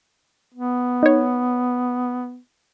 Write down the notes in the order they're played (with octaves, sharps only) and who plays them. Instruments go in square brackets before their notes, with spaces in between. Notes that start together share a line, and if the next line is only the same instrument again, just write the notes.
[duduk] B3
[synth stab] D#4 C#5